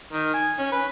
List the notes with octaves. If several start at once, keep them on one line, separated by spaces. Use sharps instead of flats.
D#3
G#5
C#4
B4